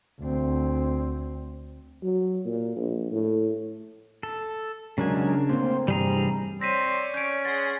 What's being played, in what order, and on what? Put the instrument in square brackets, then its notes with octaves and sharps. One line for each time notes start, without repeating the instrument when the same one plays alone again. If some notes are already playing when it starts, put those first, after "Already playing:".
[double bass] D2 C4
[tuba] F#3
A#2
A#1
A2
[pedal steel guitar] A4
[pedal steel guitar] C#3 D4 G#5 [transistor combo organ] F#3 G#3 A#4
[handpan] A3 C4 [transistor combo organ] A#3 C5
[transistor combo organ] G2 C3 [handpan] E3 [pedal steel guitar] G3 G#4 A#5
[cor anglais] C4 [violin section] C#5 D5 [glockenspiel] A#6 B6 D#7
[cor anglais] C#4 [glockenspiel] G6 D7
[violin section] G#4 F#5 C6 [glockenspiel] A6